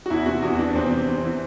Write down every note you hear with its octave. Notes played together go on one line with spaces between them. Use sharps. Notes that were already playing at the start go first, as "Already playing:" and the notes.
F#4
E2 E4
C3 F#4
E2 F#4
E3 D4
E2 C4
C3
E2
E3